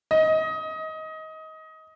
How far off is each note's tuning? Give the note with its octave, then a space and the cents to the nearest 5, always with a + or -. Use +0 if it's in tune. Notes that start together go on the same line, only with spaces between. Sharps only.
D#5 +20